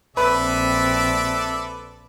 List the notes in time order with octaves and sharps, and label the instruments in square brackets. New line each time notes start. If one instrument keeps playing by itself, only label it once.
[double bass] A#1 C4 [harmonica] A4 D5 E5 [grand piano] B4